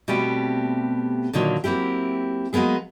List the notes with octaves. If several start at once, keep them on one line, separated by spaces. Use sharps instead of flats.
B2 G3 A3 B3 C4 G4
A#2 D3 D#3 F#3 A#3
F#3 A#3 C4 E4 G4
F#3 G#3 A#3 B3 G#4